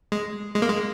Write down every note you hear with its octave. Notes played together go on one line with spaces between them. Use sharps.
G#3
G#3
A#3
G#3